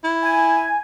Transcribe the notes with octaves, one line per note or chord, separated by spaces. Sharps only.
E4
G#5